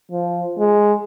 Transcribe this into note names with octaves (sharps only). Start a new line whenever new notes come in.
F3
G#3